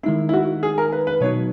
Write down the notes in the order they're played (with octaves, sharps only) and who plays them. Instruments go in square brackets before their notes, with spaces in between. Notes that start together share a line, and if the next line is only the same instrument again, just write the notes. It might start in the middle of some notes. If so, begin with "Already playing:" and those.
[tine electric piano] D#3 G#3 D#4 [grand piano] E4
[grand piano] E4
F#4
G#4
A#4
B4
B4
[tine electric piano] B2 F#3 B3 D#4 F#4 [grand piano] C#5